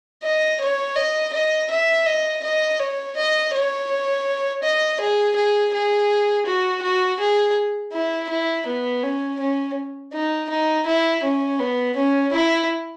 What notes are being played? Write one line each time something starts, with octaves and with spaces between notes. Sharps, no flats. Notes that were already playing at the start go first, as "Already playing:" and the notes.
D#5
C#5
D#5
D#5
E5
D#5
D#5
C#5
D#5
C#5
D#5
G#4
G#4
G#4
F#4
F#4
G#4
E4
E4
B3
C#4
C#4
D#4
D#4
E4
C#4
B3
C#4
E4